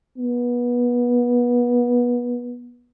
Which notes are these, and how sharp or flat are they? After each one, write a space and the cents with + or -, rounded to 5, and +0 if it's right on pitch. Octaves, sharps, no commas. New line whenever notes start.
B3 -25